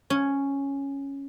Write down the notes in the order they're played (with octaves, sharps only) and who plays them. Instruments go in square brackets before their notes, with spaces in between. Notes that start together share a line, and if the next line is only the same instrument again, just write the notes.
[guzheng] C#4